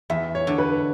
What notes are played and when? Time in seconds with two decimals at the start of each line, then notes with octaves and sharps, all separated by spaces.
0.10 E2 E5
0.35 C#5
0.47 D3
0.58 B4